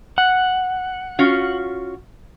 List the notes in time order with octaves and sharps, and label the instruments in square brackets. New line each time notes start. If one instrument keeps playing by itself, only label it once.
[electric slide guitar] F#5
[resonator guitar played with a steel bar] C#4 F4 F#4